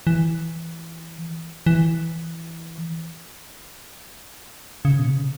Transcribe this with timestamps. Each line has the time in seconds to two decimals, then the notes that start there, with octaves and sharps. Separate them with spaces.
0.07 E3
1.66 E3
4.85 C#3
4.99 B2
5.06 C#3